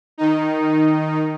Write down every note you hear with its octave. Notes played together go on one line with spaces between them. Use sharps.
D#3 D#4